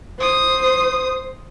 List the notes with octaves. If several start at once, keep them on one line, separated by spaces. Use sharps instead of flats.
C5 D#6